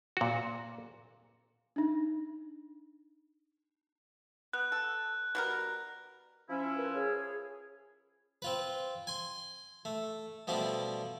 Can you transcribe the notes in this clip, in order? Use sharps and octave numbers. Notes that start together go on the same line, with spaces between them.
A#2 F#4
D4 D#4
B3 F#6
A4
B2 G3 A#4
F3 C#4 E4
A#4 B4
G#4 C#5
C4 F4 B4
G#5 C6
A3
B2 F3 G3 A3 D4